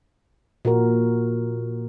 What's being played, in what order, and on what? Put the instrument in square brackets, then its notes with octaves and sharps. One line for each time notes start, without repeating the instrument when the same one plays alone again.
[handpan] A#2 F#4 A#4